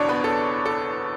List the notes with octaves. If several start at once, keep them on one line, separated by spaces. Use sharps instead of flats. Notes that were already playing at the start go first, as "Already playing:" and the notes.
Already playing: F#1 E2 B2 D4 C#5 D5 C#6
B3 B4
A4
A4